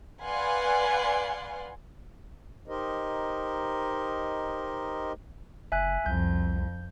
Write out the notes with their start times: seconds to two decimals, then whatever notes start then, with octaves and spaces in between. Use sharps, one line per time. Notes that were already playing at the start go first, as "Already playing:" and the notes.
0.22 B4 D5 F5 F#5 G#5 C6
2.68 D#4 G4 A#4 C5 D#5
5.72 F#1 E5 G#5 F#6
6.06 C2 F2 G6